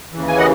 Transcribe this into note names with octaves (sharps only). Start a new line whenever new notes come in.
D#2 C#3 E3
G#5
D#5 F#5